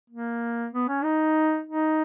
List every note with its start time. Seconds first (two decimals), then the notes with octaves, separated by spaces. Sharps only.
0.10 A#3
0.73 B3
0.88 C#4
1.04 D#4
1.67 D#4